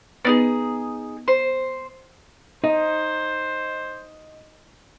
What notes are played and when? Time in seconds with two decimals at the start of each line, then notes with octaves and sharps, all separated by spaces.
0.25 B3 D4 D#4 G#4 B4
1.28 C5
2.64 D#4 C5 D#5